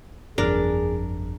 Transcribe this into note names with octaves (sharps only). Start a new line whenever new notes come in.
G1 F2 D4 G#4 A#4